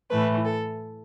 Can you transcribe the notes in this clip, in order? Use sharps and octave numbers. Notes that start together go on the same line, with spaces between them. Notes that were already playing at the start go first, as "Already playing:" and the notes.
A2 E3 A3 B4
A4